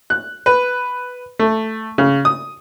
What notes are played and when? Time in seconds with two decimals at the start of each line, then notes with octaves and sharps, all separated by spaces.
0.10 F#6
0.46 B4
1.39 A3
1.98 C#3
2.25 D#6